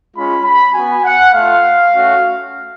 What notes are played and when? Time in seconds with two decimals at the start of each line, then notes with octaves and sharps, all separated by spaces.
0.15 G#3 C#4 F4 B5
0.44 B5
0.74 B3 F#4 G#5
1.04 F#5
1.33 A3 F4 F5
1.93 A3 C#4 F#4